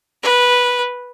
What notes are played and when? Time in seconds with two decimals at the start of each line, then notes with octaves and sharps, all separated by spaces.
0.23 B4